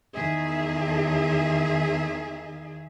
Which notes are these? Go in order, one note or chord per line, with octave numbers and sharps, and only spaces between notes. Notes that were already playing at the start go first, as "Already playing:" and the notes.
E2 D#3 G#4 E5